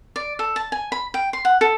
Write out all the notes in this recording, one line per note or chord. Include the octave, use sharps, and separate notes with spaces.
D5
A4
A5
G#5
B5
G5
C6
F#5
A4